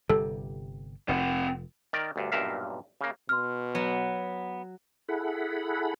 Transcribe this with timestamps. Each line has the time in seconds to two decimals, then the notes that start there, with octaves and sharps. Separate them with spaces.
0.10 G1 C3 G3 A4
1.09 F1 C4 F#5
1.93 D#3 A#4 D5
2.16 D2 G2
2.32 B1 G2 A#2 A#4 E5 F5
3.01 C#3 A#3
3.29 B2 C6 F6
3.75 F#3 B3
5.09 E4 G#4 A4 F#5 B5